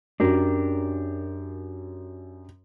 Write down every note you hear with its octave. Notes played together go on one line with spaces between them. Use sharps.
F#2 D4 G4 A#4